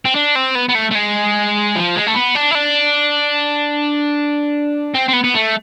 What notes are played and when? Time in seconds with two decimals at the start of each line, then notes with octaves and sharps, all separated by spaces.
0.05 C4
0.15 D4
0.35 C4
0.55 B3
0.69 B3
0.75 A3
0.91 A3
0.95 G#3
1.76 F3
1.95 G#3
2.07 A3
2.14 B3
2.35 D4
2.51 E4
2.55 D4
4.95 C4
5.08 C4
5.13 B3
5.24 B3
5.35 A3